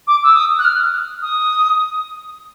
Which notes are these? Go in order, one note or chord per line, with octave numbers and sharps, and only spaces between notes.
D6
E6
D#6
F#6
F6
D#6